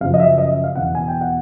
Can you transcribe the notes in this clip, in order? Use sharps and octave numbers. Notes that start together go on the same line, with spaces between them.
F#2 C#3 F3 F5
D#5
E5
D#5
E5
F5
E2 B2 F#5
G#5
G5
F#5